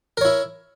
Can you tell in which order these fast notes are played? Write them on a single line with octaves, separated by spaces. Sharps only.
A#4 C#5 E4